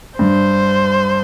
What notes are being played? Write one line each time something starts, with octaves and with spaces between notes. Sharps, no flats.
G2 C5